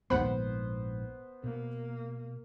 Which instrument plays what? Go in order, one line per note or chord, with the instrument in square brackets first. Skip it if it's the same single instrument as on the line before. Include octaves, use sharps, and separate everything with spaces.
[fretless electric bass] A#1 G#2 [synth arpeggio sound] D#2 F#5 B5 [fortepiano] B3 C5
[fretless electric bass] B2 [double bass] A#3